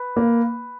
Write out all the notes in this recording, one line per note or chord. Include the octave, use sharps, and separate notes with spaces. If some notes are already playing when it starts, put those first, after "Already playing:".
Already playing: B4
A#3